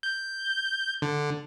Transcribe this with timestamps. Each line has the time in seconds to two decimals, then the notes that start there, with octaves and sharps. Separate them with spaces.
0.03 G6
1.02 D3